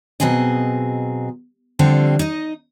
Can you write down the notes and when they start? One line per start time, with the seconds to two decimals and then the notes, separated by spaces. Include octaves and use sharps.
0.20 B2 F#3 C4 G#4 D#5
1.79 D3 F3 G3 A3 C4
2.19 D#4 D#5